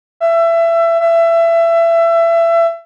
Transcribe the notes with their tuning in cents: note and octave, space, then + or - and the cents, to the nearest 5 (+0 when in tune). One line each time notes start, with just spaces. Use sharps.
E5 +25
E5 +25